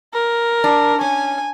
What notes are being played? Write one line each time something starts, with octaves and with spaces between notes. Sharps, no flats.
A#4
D4
C#4 G#5